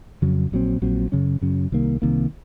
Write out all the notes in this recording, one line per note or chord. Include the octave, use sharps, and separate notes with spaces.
F2 C#3 F#3 C#4
A#1 A#2 F#3 C4
A#1 A#2 F#3 C4
F#2 C#3 F#3 C#4
F#2 C#3 F#3 C#4
C2 C3 D#3 A#3
C2 C3 D#3 A#3